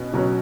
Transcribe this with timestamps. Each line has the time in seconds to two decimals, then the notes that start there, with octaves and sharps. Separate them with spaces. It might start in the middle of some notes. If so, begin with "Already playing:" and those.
Already playing: B2 C#4
0.13 B2 F#3 C#4